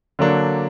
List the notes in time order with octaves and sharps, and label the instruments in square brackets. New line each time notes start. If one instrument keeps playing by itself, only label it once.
[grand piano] D3 F#3 A#3 D4